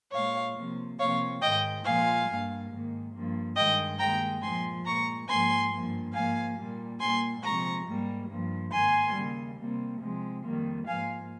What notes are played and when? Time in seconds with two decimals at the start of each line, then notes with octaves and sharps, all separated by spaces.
0.12 A#2 G#3 C#5 F5
0.55 C3 F3 A#3
0.99 C3 F3 A#3 C#5 F5
1.41 G#2 D#3 G#3 D#5 G5
1.84 A#2 F3 G#3 F5 G#5
2.28 G2 G3 A#3
2.70 G#2 D#3 A#3
3.13 G2 F3 A#3
3.56 G2 D#3 G#3 D#5 G5
3.99 D#2 D#3 G#3 G5 A#5
4.42 A#2 F3 G#3 G#5 C6
4.85 A#2 G#3 A#5 C#6
5.28 G#2 F3 A#3 G#5 C6
5.71 G2 F3 A#3
6.14 G#2 F3 A#3 F5 G#5
6.56 A#2 G3 A#3
6.99 A#2 G3 A#3 G#5 C6
7.42 C3 F3 G#3 A#5 C#6
7.85 G#2 G3 A#3
8.29 G2 F3 A#3
8.71 G#2 D#3 A#3 G#5 C6
9.14 D#2 C#3 G3 A#3
9.58 C3 G3 A#3
10.00 C3 F3 G#3
10.43 F2 D#3 G3 A#3
10.86 G#2 F3 A#3 F5 G#5